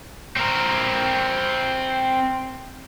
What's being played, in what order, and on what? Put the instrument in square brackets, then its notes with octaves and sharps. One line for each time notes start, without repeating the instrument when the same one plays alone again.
[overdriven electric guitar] C4 A#4